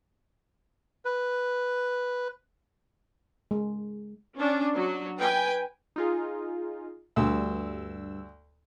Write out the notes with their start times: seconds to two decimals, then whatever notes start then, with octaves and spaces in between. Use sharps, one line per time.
1.05 B4
3.51 G#3
4.35 C#4 D4
4.76 F#3
5.18 B4 G5 G#5
5.96 D#4 F4 G#4
7.16 D2 G2 E6